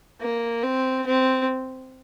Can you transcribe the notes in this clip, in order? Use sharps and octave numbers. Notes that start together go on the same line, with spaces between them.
A#3
C4
C4